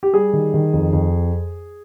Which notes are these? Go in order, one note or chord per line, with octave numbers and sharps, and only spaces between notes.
G4
G3 G#4
D#3
D#3
F2
F2